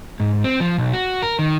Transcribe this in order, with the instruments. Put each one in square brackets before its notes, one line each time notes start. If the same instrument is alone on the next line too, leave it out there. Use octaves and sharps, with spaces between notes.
[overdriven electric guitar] G#2
C4
F3
B1
F#4
A#4
D#3